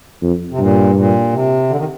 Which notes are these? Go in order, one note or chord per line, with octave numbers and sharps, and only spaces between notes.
F2
C3
G2 A#2
A#2
C3
D3
D#3